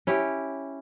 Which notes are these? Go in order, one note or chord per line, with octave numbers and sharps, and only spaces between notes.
C#4 E4 G4